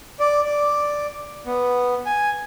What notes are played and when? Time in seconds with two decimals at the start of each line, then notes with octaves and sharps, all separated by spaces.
0.20 D5
0.45 D5
1.46 B3
2.06 G#5